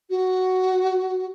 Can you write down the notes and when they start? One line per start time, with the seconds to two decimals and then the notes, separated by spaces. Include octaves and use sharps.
0.09 F#4